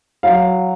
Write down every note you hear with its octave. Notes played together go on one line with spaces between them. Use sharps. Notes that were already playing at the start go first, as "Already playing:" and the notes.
F#3 F5